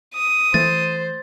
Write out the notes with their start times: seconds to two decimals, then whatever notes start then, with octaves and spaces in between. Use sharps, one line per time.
0.14 D#6
0.54 E3 A3 C5 A6